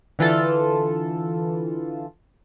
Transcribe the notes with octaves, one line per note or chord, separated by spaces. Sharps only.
D3 E3 F4 A4